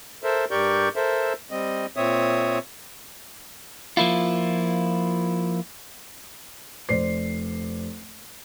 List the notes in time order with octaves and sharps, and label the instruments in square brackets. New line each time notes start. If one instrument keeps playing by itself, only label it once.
[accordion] A4 A#4 C5 E5
G2 G4 A#4 D5 C#6 G6
A4 A#4 C5 E5
G3 C4 D#5
A#2 C4 C#5 E5 D#6
[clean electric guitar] F3 A#3 E4 F4
[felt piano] F1 C5 D5 C7